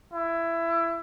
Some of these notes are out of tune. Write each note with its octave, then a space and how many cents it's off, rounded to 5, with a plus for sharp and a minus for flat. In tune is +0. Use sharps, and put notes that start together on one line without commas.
E4 +20